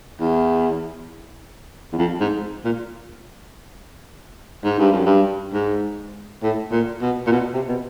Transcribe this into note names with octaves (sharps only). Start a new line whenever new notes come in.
E2
E2
F2
G#2
A#2
G#2
G2
F#2
G2
G#2
A2
A#2
B2
A#2
B2
C3
B2